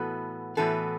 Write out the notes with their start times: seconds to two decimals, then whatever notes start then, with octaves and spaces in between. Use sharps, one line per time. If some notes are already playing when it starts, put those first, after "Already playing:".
Already playing: A2 E3 B3 F#4 A4
0.57 A2 E3 B3 F#4 A4